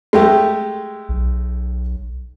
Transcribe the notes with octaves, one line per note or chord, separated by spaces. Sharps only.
G#3 A3 G4
B1